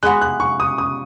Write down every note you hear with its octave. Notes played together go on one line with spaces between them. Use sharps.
G#3 B3 F#4 F#6
F#6
C#6
D#6
D#6